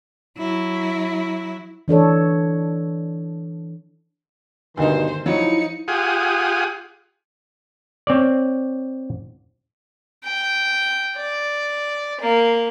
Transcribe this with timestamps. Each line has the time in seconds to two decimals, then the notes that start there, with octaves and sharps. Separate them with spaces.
0.38 F#3 E4
1.88 E3 D4 A4 C#5
4.77 D2 G2 B2 D#3 D#4 C5
5.26 F3 F#3 D#4 E4 C#7
5.88 F4 G4 G#4 F#5 D#6
8.07 C4 C#5 D5
10.24 G5
11.17 D5
12.20 A#3